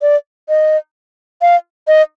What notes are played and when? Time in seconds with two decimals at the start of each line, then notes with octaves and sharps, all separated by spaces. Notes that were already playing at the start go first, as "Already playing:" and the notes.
0.02 D5
0.49 D#5
1.42 F5
1.88 D#5